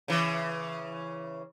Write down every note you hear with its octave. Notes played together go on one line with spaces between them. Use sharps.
C#3 E3